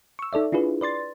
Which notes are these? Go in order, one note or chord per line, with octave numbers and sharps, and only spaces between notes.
C#6 E6
D#4 A4 D5 E5
D4 E4 F4 G#4 B4
B4 D5 C6 A6